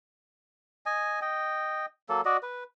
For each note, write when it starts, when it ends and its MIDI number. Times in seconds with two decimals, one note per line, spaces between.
0.86 1.20 75
0.86 1.20 80
1.21 1.86 75
1.21 1.86 79
2.09 2.21 54
2.09 2.21 58
2.09 2.21 69
2.25 2.37 66
2.25 2.37 74
2.25 2.37 75
2.43 2.64 71